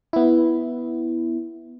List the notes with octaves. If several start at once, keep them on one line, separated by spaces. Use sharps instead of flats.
B3 E4